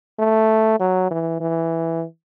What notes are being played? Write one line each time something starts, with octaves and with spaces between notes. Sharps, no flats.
A3
F#3
E3
E3